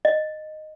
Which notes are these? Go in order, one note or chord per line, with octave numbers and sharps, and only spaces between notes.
D#5